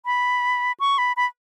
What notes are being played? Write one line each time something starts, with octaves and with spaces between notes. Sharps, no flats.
B5
C#6
B5
B5